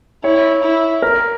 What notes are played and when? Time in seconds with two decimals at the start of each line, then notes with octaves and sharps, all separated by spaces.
0.24 E4 C#5
0.63 E4
1.02 A#4